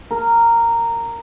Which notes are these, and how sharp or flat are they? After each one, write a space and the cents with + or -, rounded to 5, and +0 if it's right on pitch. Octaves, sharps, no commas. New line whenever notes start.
A#4 -10